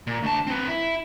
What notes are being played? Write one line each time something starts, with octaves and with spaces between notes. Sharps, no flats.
A#2
D2 A5
C4 B4
E4